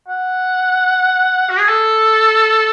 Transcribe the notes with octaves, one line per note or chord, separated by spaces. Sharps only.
F#5
F#4
G#4
A4